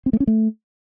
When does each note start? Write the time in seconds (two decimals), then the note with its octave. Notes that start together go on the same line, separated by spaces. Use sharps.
0.06 C4
0.13 A3
0.20 C#4
0.27 A3